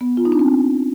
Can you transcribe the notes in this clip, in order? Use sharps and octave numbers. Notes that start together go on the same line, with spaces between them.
B3
F4
D#4
D4
C4